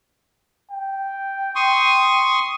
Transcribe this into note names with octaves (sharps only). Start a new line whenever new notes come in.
G5
C6 C#6 D#6